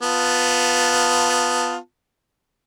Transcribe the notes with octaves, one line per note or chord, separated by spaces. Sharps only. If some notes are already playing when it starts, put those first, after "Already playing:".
B3 F4 A5